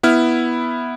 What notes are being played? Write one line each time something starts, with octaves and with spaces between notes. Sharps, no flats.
B3 E4 F6